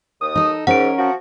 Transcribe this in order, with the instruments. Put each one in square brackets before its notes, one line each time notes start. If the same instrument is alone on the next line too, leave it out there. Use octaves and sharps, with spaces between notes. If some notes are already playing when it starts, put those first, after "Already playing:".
[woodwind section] D#2 D#6
[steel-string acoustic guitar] D#4 A4
[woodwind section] G#2 [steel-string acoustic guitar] C#4 A#4 [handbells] F#5 D7
[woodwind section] F3 F#4